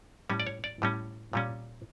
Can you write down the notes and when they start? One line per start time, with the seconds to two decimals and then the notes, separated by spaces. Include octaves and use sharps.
0.29 A2 G3 C#4
0.40 D5
0.47 C#5
0.64 D5
0.82 A2 G3 C#4
1.33 A#2 G3 C#4